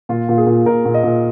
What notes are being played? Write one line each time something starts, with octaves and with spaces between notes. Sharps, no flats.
A#2 F4
A#2
G#4
A#2
A#2 A#4
A#2
D#5
A#2